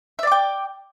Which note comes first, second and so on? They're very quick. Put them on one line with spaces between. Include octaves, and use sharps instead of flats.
E5 D5 D6 G5